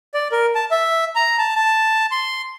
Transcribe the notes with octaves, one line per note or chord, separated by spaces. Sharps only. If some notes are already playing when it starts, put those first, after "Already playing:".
D5
A#4
A5
E5
A#5
A5
A5
C6